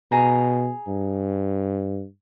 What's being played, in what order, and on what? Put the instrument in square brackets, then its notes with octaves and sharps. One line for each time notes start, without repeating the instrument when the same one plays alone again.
[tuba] B2 [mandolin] G#4 A#5
[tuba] G2